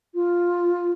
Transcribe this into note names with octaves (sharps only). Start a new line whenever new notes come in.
F4